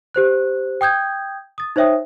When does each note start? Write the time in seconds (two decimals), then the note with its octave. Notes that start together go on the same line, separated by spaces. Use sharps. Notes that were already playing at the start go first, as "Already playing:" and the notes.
0.15 G4 C5 F#6
0.81 G5 D#6 G6 G#6
1.58 D#6 A6
1.76 D#4 C5 C#5 E5 G5 D#6